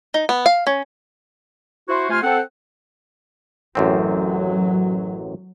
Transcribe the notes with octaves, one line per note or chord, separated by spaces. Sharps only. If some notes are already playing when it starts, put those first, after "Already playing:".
D#4
B3
F5
C#4
E4 F#4 C5
C3 A3 F4 G#5 C6 F6
C4 A4 F#5
A1 F#2 F#3 C4